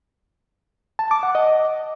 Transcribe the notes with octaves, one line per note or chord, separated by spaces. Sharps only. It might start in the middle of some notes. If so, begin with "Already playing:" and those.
A5
D6
F#5
D#5